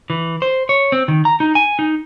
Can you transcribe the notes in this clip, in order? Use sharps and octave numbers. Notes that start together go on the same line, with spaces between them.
E3
C5
C#5
C4
D#3
A#5
D#4
G#5
D#4